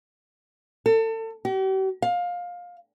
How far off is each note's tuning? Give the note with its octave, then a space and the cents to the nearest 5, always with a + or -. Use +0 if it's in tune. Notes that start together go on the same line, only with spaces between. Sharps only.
A4 +30
G4 -45
F5 +20